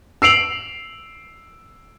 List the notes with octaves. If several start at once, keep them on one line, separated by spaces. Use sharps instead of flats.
E6 C7 D7 F7 F#7